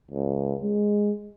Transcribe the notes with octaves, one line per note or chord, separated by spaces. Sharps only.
C#2
G#3